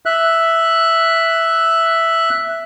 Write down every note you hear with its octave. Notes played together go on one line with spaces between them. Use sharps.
E5 F#6